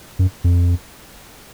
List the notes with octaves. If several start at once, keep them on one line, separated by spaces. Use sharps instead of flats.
F#2
F2